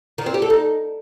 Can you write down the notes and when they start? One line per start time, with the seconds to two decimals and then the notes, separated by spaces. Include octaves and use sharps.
0.18 D#3
0.26 C4
0.34 G4
0.42 A4
0.50 D#4